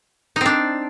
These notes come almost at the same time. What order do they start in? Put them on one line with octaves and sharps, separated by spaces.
D#4 C4 D4